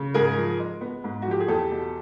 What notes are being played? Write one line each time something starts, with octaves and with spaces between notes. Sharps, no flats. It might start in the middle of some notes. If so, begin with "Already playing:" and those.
Already playing: C#3
G#2 G#4 A#4
F3
G#3
B3
G#2
F#4
F3 G4
G#4
E2 G4 A4
B2